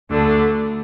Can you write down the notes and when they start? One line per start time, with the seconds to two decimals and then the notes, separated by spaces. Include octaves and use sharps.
0.10 D2 D3 A3 D4